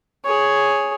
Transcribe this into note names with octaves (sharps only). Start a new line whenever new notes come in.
G#4 C#5